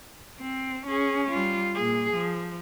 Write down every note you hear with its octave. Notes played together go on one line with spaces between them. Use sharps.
C4
C#4 G#4
G3 F4
A#2 G#4
F3